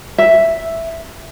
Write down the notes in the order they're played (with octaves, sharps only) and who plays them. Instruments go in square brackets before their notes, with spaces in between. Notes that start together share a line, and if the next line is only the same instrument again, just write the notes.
[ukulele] E5